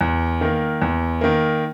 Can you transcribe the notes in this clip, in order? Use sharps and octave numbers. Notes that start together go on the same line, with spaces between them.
E2
D#3 A#3
E2
D#3 A#3